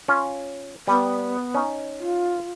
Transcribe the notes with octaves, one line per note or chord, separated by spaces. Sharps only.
C#4 F4
G3 B3 B4
C#4 D#4
F4